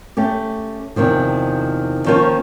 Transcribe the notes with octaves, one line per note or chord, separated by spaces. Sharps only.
A3 C#4 G4
E2 C3 D#3 F3
D#3 F3 A#3 C#4 C#5